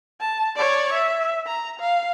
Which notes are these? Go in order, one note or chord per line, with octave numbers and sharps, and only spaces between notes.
A5
C#5 D5
E5
A#5
F5